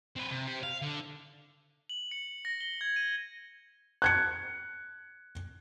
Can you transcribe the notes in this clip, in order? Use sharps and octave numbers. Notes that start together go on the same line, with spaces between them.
C4 B4
C3
G4 C5
F5
D3
F#7
C#7
A#6
G7
G#6
D#7
F#6 G#6 C#7